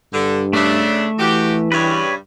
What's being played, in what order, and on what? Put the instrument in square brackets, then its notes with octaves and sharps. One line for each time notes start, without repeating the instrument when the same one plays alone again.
[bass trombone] G2 [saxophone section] D3
[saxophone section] C#3 D4 [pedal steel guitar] A3 E5
[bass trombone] E3 [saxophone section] F#4 G4
[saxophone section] G2 C#3 G3 [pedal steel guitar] B4 C#5